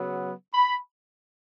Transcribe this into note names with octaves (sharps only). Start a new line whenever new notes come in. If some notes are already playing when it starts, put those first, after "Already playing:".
Already playing: C#3 F#3 B3
B5